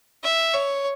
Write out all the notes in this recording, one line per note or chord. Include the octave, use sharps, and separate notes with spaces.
E5
C#5